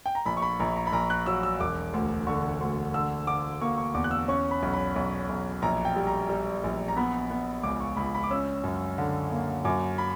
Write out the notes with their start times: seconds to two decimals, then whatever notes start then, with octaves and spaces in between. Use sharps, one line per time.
0.06 G5
0.15 A#5
0.26 A#1 B5
0.37 C#6
0.42 B5
0.60 A#1 A#5
0.76 A#5
0.87 B5
0.93 A#1 A#5
1.10 F#6
1.26 F#3 E6
1.43 E6
1.60 E1 D6
1.93 D2
2.27 D3 C#6
2.61 D2
2.94 D3 E6
3.27 D3 D6
3.61 A#3 C#6
3.77 C#6
3.94 E2 D6
4.04 F#6
4.11 E6
4.28 C#4 C#6
4.51 B5
4.62 B1
4.74 B5
4.96 B1
5.29 B1
5.62 A#1 A#5
5.85 G5
5.96 G3
6.07 A#5
6.29 G3
6.64 A#1
6.88 A#5
6.97 B3 B5
7.30 B3
7.63 C#2 D6
7.80 C#6
7.97 C#2 B5
8.15 B5
8.24 D6
8.31 C#4 E6
8.64 F#2
8.98 D3
9.31 A#3
9.65 F#2 D6
9.98 B5